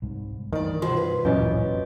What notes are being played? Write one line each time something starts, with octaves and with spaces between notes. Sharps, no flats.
C2 G#2
D2 G2 D#3 E3 D5
B2 F4 F#4 C5 C6
B4
D1 F#2 A#2 E3 C#4 C#5 D#5